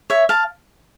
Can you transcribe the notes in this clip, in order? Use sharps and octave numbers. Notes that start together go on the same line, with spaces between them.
C#5 E5
F5 A5